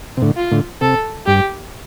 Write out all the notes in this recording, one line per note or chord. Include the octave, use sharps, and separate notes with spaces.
C3
A2 D3
F4
A2 D3
C3 A4
G2 G4